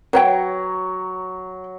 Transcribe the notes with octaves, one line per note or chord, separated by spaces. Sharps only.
F#3 B4 C#5 G5